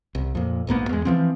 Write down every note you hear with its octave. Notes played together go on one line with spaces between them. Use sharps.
C2
F2 A#2
A#1 G#2 A#3 B3
E2 G#3
E3 F3 C4